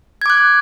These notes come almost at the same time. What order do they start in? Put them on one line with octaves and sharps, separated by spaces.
G#6 D6 F#6